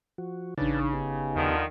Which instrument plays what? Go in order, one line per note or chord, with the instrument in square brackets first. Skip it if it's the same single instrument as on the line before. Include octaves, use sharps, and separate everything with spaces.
[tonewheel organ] F3 F#4
[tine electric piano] A1 D4 D#4 [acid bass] C#3 [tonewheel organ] B4 D5 A5
[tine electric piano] G1 [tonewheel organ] B3 D#4 G4
[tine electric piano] D#2 [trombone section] D3 D#3 F3